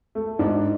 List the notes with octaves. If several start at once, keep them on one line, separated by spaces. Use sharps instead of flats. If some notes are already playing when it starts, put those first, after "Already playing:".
A3
G#2 D4